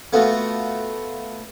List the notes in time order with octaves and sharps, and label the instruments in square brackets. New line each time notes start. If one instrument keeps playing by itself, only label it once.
[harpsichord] A3 B3 F4 F#4